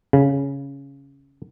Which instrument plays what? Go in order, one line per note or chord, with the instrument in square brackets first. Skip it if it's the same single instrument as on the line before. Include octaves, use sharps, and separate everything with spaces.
[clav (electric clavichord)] C#3